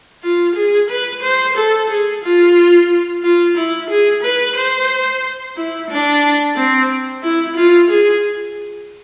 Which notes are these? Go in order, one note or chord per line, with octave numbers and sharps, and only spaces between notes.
F4
G#4
B4
C5
A4
G#4
F4
F4
E4
G#4
B4
C5
E4
D4
C4
E4
F4
G#4